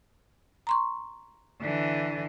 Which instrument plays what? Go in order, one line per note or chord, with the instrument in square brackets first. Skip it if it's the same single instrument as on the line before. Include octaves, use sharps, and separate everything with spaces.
[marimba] A#5 C6 C#6
[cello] D3 E3